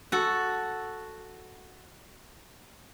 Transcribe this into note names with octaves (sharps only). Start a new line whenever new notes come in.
F#4 A4